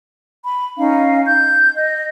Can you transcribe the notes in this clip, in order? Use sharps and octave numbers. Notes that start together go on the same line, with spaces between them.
B5
C#4 D#4 F5
G6
D#5